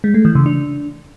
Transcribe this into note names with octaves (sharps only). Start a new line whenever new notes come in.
G#3
A3
E3
C#3
D4